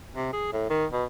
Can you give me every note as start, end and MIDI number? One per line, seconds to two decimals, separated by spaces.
0.16 0.33 48
0.33 0.52 68
0.53 0.65 45
0.70 0.86 51
0.93 1.05 47